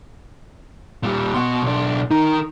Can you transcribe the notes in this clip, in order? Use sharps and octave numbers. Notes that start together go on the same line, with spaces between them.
A#2 G3
B2 F#4 C6
B1 D4
D#3 D#4 A#4